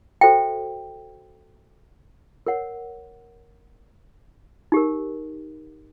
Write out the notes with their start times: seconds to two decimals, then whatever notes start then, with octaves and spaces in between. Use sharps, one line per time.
0.21 F#4 A4 C5 E5 G5
2.47 A#4 C#5 F#5
4.72 D#4 G4 A#4